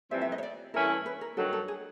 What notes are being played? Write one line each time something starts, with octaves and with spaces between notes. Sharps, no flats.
F2 C3 E3 G3 C4 E5
E5
D#5
C#5
D5
G2 E3 A3 C#4 E4 A#4
B4
A#4
G2 D#3 F#3 A4
A4
G#4